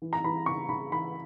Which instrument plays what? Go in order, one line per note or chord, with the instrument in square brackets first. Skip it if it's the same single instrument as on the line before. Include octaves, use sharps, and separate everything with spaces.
[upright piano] E3
A#5
E3 B5
C#3 C#6
C#3 B5
E3 B5